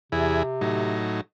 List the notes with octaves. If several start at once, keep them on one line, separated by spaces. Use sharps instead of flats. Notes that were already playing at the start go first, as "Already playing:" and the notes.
E2 C3 E4 G#4
A2 F#3 D#4